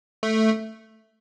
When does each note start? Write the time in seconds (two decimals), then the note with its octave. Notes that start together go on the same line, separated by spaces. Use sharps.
0.23 A3